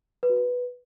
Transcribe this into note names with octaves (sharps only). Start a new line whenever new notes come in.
B4
F#4
B4